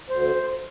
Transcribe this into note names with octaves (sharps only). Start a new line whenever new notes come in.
D2 C5